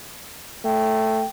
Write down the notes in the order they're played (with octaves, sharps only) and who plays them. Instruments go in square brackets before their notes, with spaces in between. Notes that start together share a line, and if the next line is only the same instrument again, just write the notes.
[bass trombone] A3 [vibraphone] G5